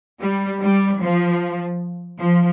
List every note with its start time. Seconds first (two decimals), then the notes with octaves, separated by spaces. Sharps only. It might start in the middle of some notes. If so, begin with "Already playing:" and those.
0.21 G3
0.61 G3
1.00 F3
2.18 F3